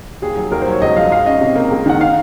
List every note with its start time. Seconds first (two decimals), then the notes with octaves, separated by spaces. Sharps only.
0.22 D#2 G#4
0.37 F#3
0.52 D#2 A#4
0.62 C5
0.67 F#3 C#5
0.81 C#2 D#5
0.96 F3 F5
1.12 G#2 F5
1.26 C#4 D#5
1.41 C3
1.55 A#3
1.70 C#2
1.86 D#3 F#5
2.01 F5